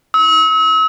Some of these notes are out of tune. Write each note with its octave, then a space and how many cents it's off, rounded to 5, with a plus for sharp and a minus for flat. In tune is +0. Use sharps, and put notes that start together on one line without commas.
E6 -40